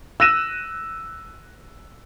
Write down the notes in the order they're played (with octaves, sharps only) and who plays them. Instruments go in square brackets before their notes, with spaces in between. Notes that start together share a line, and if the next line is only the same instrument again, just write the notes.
[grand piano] E6 F#6 A#6 D#7 E7